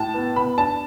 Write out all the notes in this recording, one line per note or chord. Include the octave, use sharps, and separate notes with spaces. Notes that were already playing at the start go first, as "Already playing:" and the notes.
Already playing: A2 A5
B3
B3 B5
D4 A5